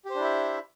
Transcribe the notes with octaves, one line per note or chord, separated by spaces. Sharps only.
D4 E4 G4 C5 E5